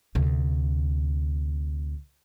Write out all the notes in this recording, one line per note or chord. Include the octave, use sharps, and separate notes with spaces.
D2 C3